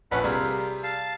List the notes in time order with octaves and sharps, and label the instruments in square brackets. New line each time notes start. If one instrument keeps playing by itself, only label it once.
[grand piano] A#1 B4 [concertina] C#4 F#5 B5
[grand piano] C3 G3 G#4 [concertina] F4 A#4
[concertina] F5 A5